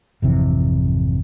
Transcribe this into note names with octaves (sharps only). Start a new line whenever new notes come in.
G#1 F2 C3 E3